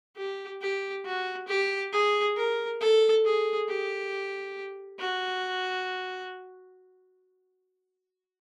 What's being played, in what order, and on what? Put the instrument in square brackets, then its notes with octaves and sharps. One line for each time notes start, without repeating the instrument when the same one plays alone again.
[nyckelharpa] G4
G4
F#4
G4
G#4
A#4
A4
G#4
G4
F#4